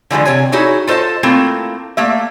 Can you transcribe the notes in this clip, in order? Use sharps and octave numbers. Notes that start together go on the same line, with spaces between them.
D3 E3 F3 G#3
C3 C#5 G#5
D#4 E4 F#4 G#4 C#5
F4 A4 C5 D#5 A5
A3 A#3 C4 E4 F4
A3 A#3 E5